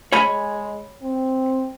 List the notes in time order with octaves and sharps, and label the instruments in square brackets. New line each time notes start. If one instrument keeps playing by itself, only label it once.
[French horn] G#3 [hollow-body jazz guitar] C#5 G#5 B5
[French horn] C4